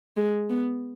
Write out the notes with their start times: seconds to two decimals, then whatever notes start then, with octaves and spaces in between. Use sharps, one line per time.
0.17 G#3
0.49 B3